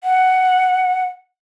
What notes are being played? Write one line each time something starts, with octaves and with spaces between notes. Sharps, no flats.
F#5